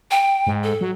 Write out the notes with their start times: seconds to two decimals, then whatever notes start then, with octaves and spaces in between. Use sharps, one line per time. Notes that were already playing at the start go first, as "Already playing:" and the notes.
0.11 G5
0.47 G#2
0.64 A4
0.81 F#3